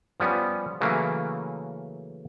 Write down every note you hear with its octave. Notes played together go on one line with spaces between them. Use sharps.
F3 G3 B3 C#4
C#3 E3 F#3 A3 A#3 C#4